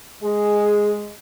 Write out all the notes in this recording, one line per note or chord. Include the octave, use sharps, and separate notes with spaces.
G#3 G#4